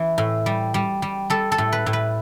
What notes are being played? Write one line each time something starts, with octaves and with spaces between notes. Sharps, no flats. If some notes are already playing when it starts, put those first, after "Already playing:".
Already playing: E3
A2
G3
G3
G3
G3 A4
A4
A2
B4
A2
B4